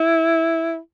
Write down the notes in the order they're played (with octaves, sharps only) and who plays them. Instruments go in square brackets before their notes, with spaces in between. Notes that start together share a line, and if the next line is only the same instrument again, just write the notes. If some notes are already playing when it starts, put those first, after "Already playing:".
Already playing: [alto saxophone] E4